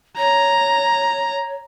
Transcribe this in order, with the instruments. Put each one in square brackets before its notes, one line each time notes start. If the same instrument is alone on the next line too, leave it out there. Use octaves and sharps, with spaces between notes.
[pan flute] C#5 [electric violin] A#5